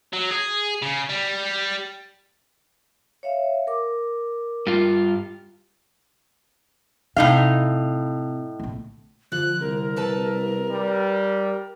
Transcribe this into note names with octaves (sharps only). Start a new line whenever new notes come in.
F#3
G#4
C#3
G3
C#5 E5 F5
A#4 D6
G2 F4
A2 C3 D#4 F5
A#1 A3
D3 F3 F#6
C2 A#4
A4 B4 A5
G3